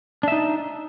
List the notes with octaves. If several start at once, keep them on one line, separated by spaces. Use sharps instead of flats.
D4 D#4 E5